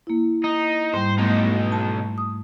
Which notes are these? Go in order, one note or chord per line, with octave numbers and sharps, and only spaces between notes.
A#3 E4
D#4
G#2 G3 C5
B2 A3 D#4
A5
D#6